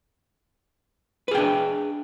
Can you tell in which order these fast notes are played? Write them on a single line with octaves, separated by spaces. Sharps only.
B4 G#4 G5 D4